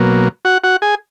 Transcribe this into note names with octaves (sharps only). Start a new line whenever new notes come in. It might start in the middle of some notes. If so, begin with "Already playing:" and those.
Already playing: B2 F#3 A#3
F#4 F#5
F#4 F#5
G#4 G#5